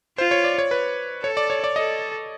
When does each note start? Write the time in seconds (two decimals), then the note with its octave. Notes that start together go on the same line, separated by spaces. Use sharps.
0.18 F4 C5
0.31 C#5
0.44 D5
0.58 C#5
0.71 B4
1.24 A4 C#5
1.37 D5
1.50 C#5
1.64 D5
1.76 A4 D#5